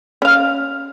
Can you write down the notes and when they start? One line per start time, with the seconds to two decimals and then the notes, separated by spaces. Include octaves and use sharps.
0.22 C#4 F5